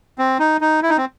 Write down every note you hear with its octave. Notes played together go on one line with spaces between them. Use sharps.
C4
D#4
D#4
E4
D#4
C4